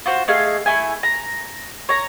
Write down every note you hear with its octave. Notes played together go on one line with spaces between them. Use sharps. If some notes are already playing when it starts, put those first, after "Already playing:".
F4 F#4 C5
A3 D#4 G#4 F5
A3 E4 G#5
A#5
C#5 A#5